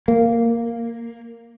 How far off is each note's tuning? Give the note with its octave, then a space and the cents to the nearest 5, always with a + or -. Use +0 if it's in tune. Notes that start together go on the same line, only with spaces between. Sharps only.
A#3 -5